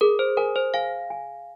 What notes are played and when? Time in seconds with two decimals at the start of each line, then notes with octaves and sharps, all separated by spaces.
0.01 G#4 A#4
0.19 C5
0.37 A#4 G#5
0.56 C5
0.74 F5 G#5
1.10 G#5